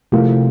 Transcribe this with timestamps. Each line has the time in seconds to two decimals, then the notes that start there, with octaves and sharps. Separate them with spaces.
0.12 C3 F3 A3 E4 A#4 F5